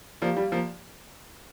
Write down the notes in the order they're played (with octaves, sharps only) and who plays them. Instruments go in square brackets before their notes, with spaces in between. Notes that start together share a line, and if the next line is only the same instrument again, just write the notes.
[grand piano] F3 A#3 [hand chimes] G4 D5 F5
[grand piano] G3
F3 A#3